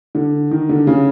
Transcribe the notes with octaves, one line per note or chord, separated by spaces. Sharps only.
D3
D#3
D3
C#3